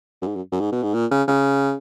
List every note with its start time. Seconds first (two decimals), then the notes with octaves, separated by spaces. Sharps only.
0.22 F#2
0.27 G#2
0.36 F#2
0.52 F#2
0.61 G#2
0.72 B2
0.83 G#2
0.94 A#2
1.11 C#3
1.28 C#3